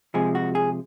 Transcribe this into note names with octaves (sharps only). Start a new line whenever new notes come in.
C3 F3 G#3 G#4
F#4
G#4